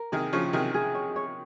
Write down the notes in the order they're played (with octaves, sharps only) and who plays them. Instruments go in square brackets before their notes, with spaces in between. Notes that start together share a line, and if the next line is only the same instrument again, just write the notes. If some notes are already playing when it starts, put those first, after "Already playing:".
Already playing: [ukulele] A#4
[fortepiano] C3 D#3 [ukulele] G#4
[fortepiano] C#3 F3 [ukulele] C#5
[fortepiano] C3 D#3 [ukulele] G#4
[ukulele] G#4
C#5
C#5